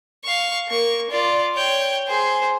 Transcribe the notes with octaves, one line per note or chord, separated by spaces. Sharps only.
F5 C#6
A#3 C#6
F4 D5
C#5 G5
G#4 C5